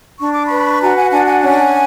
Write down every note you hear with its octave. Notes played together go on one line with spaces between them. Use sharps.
D4 C#6
D6
B4 B5 C#6
F#4 G#5 A#5
F#5 G#5
D4 F#5 G#5
F#5 G#5
C#4